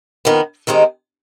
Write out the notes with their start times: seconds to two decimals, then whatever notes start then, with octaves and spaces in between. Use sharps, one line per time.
0.25 F2 D#3 B3
0.67 D#2 D#3 G#3 C4 D#4